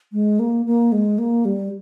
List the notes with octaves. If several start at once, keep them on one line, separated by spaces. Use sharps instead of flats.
G#3
A#3
A#3
G#3
A#3
G3